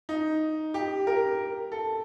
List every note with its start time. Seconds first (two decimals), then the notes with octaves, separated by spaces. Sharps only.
0.09 D#4
0.74 G4
1.07 A#4
1.72 A4